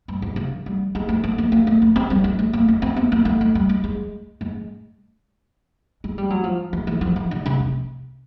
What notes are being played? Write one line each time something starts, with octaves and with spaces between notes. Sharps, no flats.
G2
G#2
C#3
G3
G#3
A3
A3
A#3
A#3
A3
A#3
C4
G3
G#3
A3
A#3
C#4
C4
B3
A#3
A3
G#3
G3
G#3
G#3
G#3
G#3
G3
F#3
F3
E3
E3
F3
E3
D3
C#3
C3